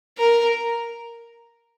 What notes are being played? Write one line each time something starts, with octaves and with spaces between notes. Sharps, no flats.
A#4